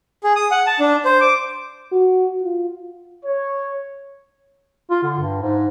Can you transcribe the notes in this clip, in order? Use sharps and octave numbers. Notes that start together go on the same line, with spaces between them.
G#4
D#6
F#5
A5
D4
C5
D6
F#4
F4
C#5
F4
D3
G2
G#2